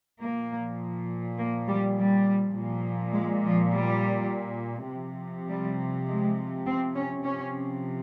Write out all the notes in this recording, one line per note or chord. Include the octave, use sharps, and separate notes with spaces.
A#2 F3 A#3
A#3
G3
G3
A#2 F3
G#3
F3
G3
C3 F3
G3
G#3
C4
C#4
C3 F3 C#4